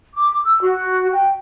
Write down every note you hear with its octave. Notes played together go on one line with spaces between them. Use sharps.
D6
E6
F#4
G5